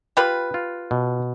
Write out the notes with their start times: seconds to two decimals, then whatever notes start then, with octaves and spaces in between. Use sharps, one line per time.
0.17 F4 G4 B4
0.54 F4
0.91 B2